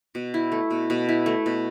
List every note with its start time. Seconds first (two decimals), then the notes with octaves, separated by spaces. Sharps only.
0.15 B2
0.34 E4
0.52 A3
0.71 B2
0.90 B2
1.09 E4
1.26 A3
1.46 B2